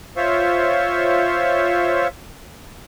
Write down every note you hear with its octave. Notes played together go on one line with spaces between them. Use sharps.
F4 C5 C#5 E5